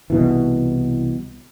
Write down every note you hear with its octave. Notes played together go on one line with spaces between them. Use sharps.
C2 B2 E3